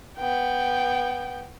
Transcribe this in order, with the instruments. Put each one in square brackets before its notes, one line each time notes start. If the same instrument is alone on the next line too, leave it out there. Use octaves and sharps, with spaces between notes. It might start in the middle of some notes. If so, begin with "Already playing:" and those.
[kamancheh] B3 G5